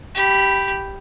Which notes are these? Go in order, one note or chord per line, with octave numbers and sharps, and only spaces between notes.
G4 B5